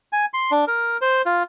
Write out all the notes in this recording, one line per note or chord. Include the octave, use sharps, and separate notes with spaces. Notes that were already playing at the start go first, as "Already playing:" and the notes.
G#5
C6
D4
A#4
C5
F4